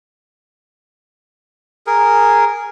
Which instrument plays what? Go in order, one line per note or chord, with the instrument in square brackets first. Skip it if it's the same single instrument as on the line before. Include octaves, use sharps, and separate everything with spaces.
[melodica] G#4 A#4